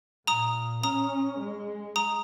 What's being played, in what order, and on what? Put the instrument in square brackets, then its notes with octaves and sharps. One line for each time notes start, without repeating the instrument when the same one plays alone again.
[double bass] A#2 [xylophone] A#5 D#6
[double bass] C#4 [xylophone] A#5 D#6
[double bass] G#3
[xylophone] A#5 D#6